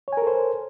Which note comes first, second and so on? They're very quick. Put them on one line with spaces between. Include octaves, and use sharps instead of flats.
C#5 G#5 A#4 A4 C5